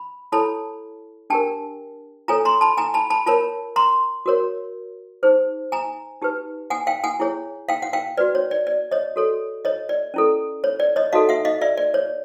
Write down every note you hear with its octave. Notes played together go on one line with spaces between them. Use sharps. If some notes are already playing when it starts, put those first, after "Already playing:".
Already playing: B5
E4 A4 C#5 A5 B5
D4 G4 A#4 G5 A5
F4 A4 C#5 G#5 A#5
A#5 C6
A5 B5
G#5 A#5
A5 B5
A5 B5
F4 A#4 C#5 A5 B5
A#5 C6
F#4 A#4 C#5
D#4 G#4 C5
G#5 A#5
D#4 G4 B4
F#5 G#5
F5 G5
F#5 G#5
E4 G#4 C#5
F5 G5
F#5
F5 G5
F#4 B4 D5
C#5
D5
D5
C#5 D#5
F#4 A4 C#5
C#5 D#5
D5
C#4 E4 A4
C#5
D5
C#5 D#5
D#4 F#4 A4 D#5 F5
E5 F#5
D#5 F5
D5 E5
D5
C#5